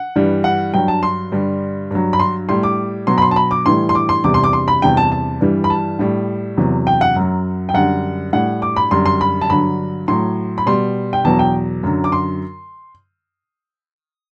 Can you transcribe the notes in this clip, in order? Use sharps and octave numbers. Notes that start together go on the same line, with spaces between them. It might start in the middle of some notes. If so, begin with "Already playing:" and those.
Already playing: F#5
G2 E3 G3
F#5
G2 F#3 G5
A5
C6
G2 D3 G3
G2 F#3
B5
C6
A2 G3 C6
D6
B2 F#3 C6
B5
C6
A5
B5
D6
A2 E3 G3 C6
C6
D6
C6
E2 C3 G3 D6
C6
D6
C6
B5
E2 C3 G3 G5
A5
A5
G2 E3 G3
B5
A5
A2 G3
E2 C3 F#3
G5
F#5
F#2 F#3
G5
F#2 D3 G3 F#5
A2 G3 F#5
D6
B5
F#2 D3 G3 C6
C6
B5
A5
G2 D3 F#3 B5
A2 F#3 C6
B5
B2 G3 C6
G5
E2 B2 F#3 A5
G5
F#2 D3 F#3
D6
C6